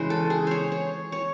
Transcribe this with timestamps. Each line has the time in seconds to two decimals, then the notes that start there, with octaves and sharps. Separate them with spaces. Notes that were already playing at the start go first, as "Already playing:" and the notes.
Already playing: C#3 E3 G#3 C5
0.10 A4
0.30 G#4
0.47 C5 C#5
0.72 C#5
1.12 C#5